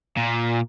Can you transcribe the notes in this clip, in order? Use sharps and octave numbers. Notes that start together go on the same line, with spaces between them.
A#2